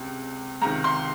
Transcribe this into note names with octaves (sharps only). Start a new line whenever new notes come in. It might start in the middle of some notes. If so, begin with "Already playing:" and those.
Already playing: C#2 C3
C#2 C3 D#3 A#5
C6